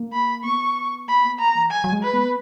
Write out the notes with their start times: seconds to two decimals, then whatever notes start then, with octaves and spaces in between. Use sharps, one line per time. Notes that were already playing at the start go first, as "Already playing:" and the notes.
Already playing: A#3
0.13 B5
0.43 B3 C#6
1.08 A#3 B5
1.24 B3
1.39 A#3 A#5
1.55 E3
1.71 F#3 G#5
1.84 F#3
1.92 G#3
2.02 B4
2.14 B3